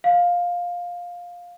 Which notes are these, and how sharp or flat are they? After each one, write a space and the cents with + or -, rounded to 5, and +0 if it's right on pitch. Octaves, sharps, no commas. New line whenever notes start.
F5 +15